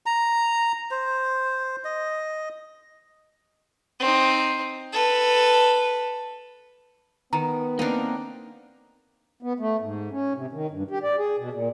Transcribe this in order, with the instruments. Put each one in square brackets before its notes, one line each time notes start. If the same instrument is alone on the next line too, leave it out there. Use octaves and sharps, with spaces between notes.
[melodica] A#5
C5
D#5
[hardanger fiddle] C4 D#4
A4 B4
[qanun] D#3 [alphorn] B3 [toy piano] A#5
[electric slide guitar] A#3 C4 A#4 [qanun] D4 D#4
[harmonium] B3
A3
G#2
C#4
C3
D#3
G2
G4
D5
G#4
B2
A#2